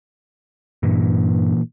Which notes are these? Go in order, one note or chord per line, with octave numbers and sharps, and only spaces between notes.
G2 A#2 E3